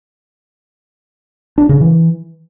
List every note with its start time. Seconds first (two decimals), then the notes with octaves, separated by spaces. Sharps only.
1.58 D4
1.69 C#3
1.81 E3